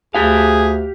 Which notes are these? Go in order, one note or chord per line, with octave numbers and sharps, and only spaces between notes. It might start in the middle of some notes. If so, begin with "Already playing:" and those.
D2 G4 G#4 F5